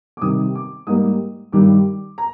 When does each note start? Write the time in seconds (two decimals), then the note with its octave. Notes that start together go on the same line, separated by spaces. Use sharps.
0.17 D6
0.21 C3 D#3 G3 D#6
0.55 D6
0.87 G#2 G3 A#3 D#6
1.52 G2 D#3 G3 D6
2.18 A#5